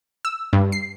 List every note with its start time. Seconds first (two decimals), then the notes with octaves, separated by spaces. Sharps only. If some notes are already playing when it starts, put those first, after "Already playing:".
0.25 E6
0.53 G2
0.72 C7